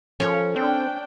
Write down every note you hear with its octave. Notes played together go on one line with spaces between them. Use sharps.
F3 C#4 A4 A#4 C#5
C4 D4 G5